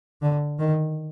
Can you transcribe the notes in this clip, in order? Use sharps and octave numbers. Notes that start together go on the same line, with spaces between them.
D3
D#3